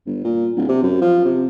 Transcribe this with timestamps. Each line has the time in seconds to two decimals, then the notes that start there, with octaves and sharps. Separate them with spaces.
0.06 G1
0.24 A#2
0.56 D1
0.69 C3
0.82 F#2
1.01 F3
1.25 C3